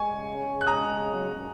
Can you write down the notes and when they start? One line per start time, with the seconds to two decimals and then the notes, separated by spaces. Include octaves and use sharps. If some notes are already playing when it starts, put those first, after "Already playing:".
Already playing: G#3 G#5 C#6
0.08 C#3
0.28 C#4
0.47 C#3
0.61 F#6
0.67 G#3 A#5 D#6
0.87 C#3
1.06 F#3
1.26 F#2